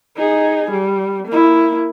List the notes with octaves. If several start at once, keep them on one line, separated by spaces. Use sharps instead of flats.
D#4 G#4
G3
A#3 E4